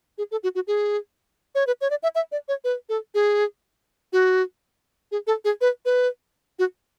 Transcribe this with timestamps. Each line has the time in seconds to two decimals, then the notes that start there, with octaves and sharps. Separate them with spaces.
0.18 G#4
0.31 A4
0.43 F#4
0.55 F#4
0.67 G#4
1.55 C#5
1.67 B4
1.81 C#5
1.90 D5
2.03 E5
2.15 E5
2.32 D5
2.48 C#5
2.64 B4
2.89 A4
3.14 G#4
4.13 F#4
5.12 G#4
5.27 A4
5.45 G#4
5.61 B4
5.85 B4
6.59 F#4